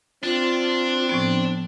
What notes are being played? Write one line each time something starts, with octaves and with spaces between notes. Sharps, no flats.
C4 D4 F4
A2 F3 B3